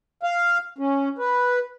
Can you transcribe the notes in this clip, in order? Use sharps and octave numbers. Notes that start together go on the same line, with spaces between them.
F5
C#4
B4